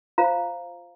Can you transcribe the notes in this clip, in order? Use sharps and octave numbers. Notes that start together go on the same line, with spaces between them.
F4 C5 F5 A#5